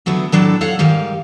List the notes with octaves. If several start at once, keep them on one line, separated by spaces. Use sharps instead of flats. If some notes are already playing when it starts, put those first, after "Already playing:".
D3 F#3 A3 B3
A2 F#3 D4 A4
A4 C#5 F5 F#5
G#2 D#3 G3 F5